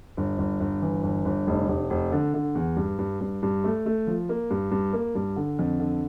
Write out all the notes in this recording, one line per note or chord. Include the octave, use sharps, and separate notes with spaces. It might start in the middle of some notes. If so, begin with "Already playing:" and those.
G1
G1
G1
E3
G1
G1
F1
F1
F1
D3
D3
E2
G2
G2
G2
G2
A3
A3
F3
A#3
G2
G2
A#3
G2
D3
F2
D3